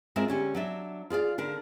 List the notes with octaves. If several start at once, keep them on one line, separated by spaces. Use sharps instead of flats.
G#3 C4 F4 A#4 E5
D3 C#4 G4
F#3 D4 E5
F4 G#4 D5 F5
D3 D4 A#4